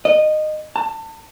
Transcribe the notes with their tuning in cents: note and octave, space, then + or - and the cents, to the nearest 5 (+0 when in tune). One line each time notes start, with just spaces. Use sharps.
D#5 -20
A5 +30